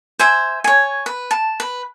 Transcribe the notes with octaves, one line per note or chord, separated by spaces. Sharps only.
C5 E5 G#5
C#5 G#5
B4
A5
B4